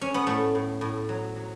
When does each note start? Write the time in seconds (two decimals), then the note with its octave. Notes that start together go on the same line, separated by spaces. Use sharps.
0.01 C#4
0.14 B3
0.27 A2 A3
0.55 A2
0.81 A2
1.09 F#3
1.36 F#3